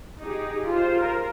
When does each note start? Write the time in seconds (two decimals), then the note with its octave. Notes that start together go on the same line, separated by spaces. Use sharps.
0.22 D#4 G4 G#4
0.70 F4 C5
1.00 A#4